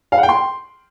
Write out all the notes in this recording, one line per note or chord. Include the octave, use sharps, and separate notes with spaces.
F5
F#5
G5
C6